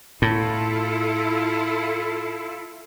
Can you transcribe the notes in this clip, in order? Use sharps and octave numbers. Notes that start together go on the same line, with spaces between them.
A2 E4 F4 A4